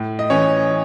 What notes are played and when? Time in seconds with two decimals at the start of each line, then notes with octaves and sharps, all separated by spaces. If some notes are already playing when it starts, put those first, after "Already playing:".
Already playing: A2
0.19 D#5
0.30 E3 C#4 C#5